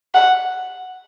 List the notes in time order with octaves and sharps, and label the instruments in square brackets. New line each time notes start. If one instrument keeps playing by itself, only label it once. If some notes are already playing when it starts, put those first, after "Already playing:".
[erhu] F#5